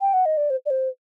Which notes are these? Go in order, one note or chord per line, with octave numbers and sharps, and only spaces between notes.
G5
F#5
D#5
D5
C5
D5
C5